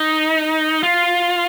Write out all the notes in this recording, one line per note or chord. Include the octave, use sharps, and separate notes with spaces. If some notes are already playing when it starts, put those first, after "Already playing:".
Already playing: D#4
F4